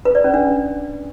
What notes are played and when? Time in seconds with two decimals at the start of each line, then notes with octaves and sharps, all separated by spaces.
0.05 B4
0.15 D5
0.24 C#4
0.34 D4